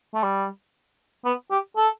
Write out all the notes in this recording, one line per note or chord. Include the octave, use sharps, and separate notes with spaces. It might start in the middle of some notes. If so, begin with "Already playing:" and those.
A3
G3
B3
G4
A4